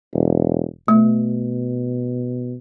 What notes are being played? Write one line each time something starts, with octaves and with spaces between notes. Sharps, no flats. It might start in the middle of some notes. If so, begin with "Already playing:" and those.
E1
B2 A3